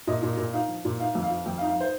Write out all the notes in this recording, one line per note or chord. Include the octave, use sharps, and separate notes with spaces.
A#2 D#5
A#2
A#2
D#4 F5
F3
A#2
D#4 F5
F2
F5
F3
F2 G5
F5
D#4
F5
C5